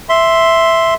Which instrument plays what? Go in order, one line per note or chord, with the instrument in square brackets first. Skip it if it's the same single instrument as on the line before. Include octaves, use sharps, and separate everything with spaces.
[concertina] E5 C6